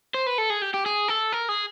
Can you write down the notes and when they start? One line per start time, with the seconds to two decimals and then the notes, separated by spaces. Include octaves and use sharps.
0.14 C5
0.27 B4
0.38 A4
0.50 G#4
0.62 G4
0.74 G4
0.86 G#4
1.08 A4
1.32 A#4
1.49 G#4